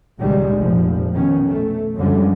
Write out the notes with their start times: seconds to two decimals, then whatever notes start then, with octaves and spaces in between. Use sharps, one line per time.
0.18 C#2 A#2 D#3 G3 G#3
0.55 F1 A#1 A#2 F3
1.12 B2 D#3 C#4
1.46 A3
1.96 F#2 D3 F3 G3 G#3